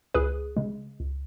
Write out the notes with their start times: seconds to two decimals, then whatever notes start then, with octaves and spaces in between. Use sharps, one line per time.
0.14 C#2 G#4 B4
0.57 C#3 G#3
1.00 C#2